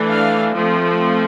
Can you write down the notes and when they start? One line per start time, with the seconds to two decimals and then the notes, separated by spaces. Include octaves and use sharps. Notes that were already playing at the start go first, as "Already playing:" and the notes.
Already playing: E3 A3 D4
0.10 F5
0.57 F3 A3 C4